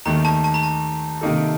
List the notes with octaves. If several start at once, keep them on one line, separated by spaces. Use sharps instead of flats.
D#2 D#3 A3 A#5
A5
A5
A#5
A5
C3 D#3 A#3 D#4 A4